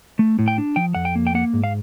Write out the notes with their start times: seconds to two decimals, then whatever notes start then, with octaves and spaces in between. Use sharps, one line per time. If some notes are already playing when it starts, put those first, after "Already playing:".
0.19 A3
0.39 A2
0.48 G5
0.58 D4
0.76 F3 G5
0.95 F2 F#5
1.05 G5
1.16 A#3
1.27 G5
1.35 A#3 F#5
1.53 G#2
1.64 F5